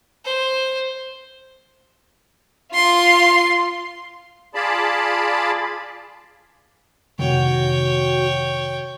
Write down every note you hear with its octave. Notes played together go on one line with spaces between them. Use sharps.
C5
F4 C6
F4 G#4 D5 A5 B5
F2 C3 D#3 F#4 C#5 G5